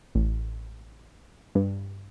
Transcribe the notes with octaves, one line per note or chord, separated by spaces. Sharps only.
A1
G2